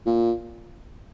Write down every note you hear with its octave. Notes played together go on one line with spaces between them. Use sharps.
A#2